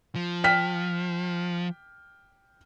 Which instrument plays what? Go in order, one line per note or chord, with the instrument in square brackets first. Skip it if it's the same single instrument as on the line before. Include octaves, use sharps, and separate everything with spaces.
[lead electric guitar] F3
[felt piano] G5 F6 B6